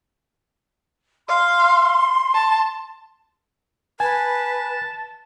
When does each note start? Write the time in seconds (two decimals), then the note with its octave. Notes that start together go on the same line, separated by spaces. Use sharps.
1.29 F5 C6
2.34 A5
4.00 B4 G#5 A5